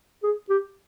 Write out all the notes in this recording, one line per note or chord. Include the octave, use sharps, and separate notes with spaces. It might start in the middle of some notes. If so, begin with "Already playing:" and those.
G#4
G4